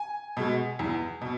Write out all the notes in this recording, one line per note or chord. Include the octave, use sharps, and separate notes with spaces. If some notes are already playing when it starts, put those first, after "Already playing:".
Already playing: G#5
B2 G#3
E2
B2